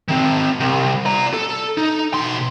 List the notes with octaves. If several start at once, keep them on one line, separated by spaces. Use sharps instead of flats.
D#3 C4
C2
D5 A#5
A4
D#4
B2 C6